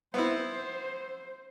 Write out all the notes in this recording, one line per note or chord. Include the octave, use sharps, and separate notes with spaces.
B3 C4 E4 C5